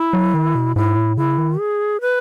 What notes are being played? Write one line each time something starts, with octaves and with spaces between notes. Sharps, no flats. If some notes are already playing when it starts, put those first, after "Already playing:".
Already playing: E4
F#3
D#3
B2
G#2 E4
A2
C#3 E4
D#3
G#4
B4